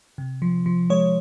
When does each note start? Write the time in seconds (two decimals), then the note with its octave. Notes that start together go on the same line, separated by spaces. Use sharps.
0.18 C3
0.42 F3
0.66 F3
0.90 G#3 C#5